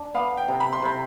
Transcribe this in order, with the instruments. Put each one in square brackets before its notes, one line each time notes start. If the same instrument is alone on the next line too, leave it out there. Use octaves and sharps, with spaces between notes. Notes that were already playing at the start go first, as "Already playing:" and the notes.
Already playing: [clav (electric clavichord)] D4
[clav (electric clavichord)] B3 [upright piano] F5
[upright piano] G5
[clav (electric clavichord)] C3
[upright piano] B5
C6
[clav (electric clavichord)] C3 [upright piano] B5